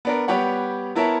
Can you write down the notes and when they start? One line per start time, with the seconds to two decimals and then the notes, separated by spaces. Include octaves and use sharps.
0.05 B3 D4 A#4
0.28 G3 B3 G4 C#5 F#5
0.95 B3 E4 A#4 C#5 E5 A5